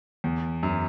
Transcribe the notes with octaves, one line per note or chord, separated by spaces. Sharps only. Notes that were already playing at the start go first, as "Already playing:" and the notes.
E2
F#2